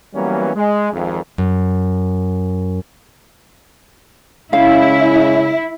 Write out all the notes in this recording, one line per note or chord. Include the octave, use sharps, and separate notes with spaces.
E3 F#3 G3 A#3 B3 C#4
G#3
G#1 F2
F#2
C#3 G#3 C#4 E4 F5